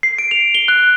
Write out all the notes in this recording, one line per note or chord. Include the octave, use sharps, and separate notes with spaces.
C7
D7
F7
G7
F#6